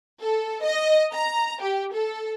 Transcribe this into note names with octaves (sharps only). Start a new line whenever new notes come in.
A4
D#5
A#5
G4
A4